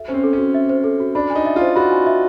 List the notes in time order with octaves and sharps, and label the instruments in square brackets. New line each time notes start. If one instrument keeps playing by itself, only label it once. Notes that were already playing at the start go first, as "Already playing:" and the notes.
Already playing: [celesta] F#4 A4 E5
[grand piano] C#4 [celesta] C5
[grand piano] C4
[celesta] A4
[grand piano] C#4
[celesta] F#4
E5
C5
A4
F#4
[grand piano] D4 [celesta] B5
[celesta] G#5
[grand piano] D#4
[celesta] E5
[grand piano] F4
[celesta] C5
[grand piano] F#4 [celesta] B5
[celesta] G#5
E5